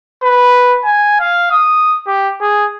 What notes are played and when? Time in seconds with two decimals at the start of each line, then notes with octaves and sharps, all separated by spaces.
0.23 B4
0.84 G#5
1.20 F5
1.51 D#6
2.07 G4
2.41 G#4